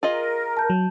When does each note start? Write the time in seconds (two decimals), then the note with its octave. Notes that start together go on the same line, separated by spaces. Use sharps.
0.03 F4 G#4 A#4 D#5
0.57 A5 G6
0.70 F#3